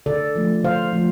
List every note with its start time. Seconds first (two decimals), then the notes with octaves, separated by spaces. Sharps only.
0.06 D3 A4 D5
0.36 F3 A3
0.64 D3 C5 F5
0.93 F3 A3